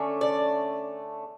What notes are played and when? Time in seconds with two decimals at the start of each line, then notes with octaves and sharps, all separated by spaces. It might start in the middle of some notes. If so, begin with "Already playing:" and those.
Already playing: D3 A3 C#4
0.21 D5